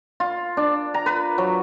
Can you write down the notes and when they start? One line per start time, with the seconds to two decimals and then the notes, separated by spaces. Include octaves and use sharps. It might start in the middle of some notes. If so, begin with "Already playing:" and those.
0.20 F4
0.57 D4
0.94 A#5
1.06 B4
1.38 F#3